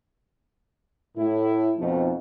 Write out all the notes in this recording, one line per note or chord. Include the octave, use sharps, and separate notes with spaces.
A2 E4
F2 B2 F3 A3 C4 D#4